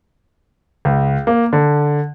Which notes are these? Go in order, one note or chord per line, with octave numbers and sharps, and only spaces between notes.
C#2
A#3
D3